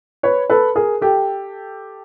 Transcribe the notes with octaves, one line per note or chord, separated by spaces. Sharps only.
B4 C#5
A4 B4
G#4 A#4
G4 A4